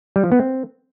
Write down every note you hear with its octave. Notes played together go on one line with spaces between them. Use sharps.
G3
F3
B3
C4